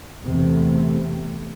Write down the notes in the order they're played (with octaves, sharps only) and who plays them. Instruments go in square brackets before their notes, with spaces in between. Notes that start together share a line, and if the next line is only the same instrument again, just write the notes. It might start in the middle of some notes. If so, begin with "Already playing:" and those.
[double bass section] E2 C3 A3